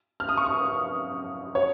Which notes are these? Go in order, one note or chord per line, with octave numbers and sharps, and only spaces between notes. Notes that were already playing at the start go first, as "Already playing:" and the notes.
F6
D#6
C#6
D#6
C#5